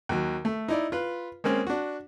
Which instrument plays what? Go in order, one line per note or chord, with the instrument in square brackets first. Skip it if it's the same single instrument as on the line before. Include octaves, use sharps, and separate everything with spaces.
[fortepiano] D#2 F#3
A3
D#4 E4 D5
F4 B4
G#3 A#3 C4 C#4
D4 F#4